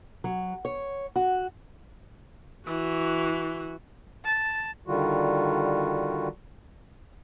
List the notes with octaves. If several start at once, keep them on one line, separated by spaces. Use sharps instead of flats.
F#3
C#5
F#4
E3 F#4
A5
D3 D#3 G3 F4 F#4